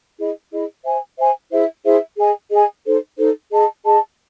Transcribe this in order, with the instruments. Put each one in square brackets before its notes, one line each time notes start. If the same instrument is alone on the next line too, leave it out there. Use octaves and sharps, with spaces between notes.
[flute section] E4 G#4 D#5
E4 G#4 D#5
C5 E5 G#5
C5 E5 G#5
E4 G#4 C5 E5
E4 G#4 C5 E5
G#4 D#5 G#5
G#4 D#5 G#5
D#4 A4 C5
D#4 A4 C5
G#4 D#5 A5
G#4 D#5 A5